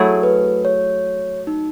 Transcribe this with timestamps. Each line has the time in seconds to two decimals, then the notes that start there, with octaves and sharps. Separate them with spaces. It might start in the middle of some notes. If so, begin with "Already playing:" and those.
Already playing: F#3 A3 E4 G#4
0.23 B4
0.65 C#5
1.47 D#4